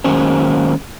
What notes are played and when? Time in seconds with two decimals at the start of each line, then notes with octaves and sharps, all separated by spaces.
0.04 D#3 F#3 G#3 A#3 C#4 C5